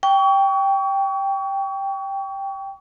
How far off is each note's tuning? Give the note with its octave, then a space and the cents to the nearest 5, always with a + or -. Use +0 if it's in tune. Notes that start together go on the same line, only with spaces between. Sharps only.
G5 +0 C#6 +30